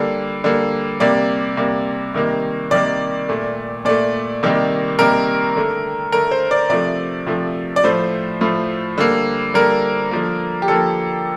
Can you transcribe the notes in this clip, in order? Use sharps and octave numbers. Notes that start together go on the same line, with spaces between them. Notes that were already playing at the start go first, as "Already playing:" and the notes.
Already playing: D3 G3 A#3
D3 G3 A#3
C3 G3 A#3 D5
C3 G3 A#3
C3 D#3 G3 A#3
C3 D#3 G3 A#3 D5
A#2 A3
A#2 A3 D5
C3 D#3 G3 A#3
C3 D#3 G3 A#3 A#4
D3 A3
D3 A3 A#4
C5
D5
C3 F3 A3 D5
C3 F3 A3
D5
A2 F3 A3 C5
A2 F3 A3
D3 G3 A#3
D3 G3 A#3 A#4
D3 F3 A#3
G4
D3 F3 A#3 A4